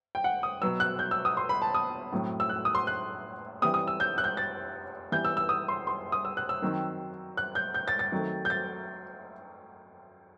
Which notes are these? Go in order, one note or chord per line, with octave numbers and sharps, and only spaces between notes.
G5
F#5
D#6
B2 F#3 B3 E6
F#6
G6
E6
D#6
C6
B5
A5
D#6
A2 F#3 C4
E6
F#6
D#6
C6
F#6
E3 G3 C4 D#6
D#6
E6
G6
F#6
G6
A6
E3 G3 B3 G6
E6
E6
D#6
C6
C6
D#6
E6
F#6
E6
D#3 F#3 C4
F#6
G6
G6
A6
A6
D#3 F#3 A3 C4
G6
A6